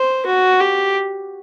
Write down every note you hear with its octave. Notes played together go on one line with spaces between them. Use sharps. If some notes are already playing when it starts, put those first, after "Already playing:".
Already playing: C5
F#4
G4